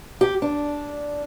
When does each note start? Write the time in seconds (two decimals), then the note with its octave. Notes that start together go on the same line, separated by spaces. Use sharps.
0.21 G4
0.42 D4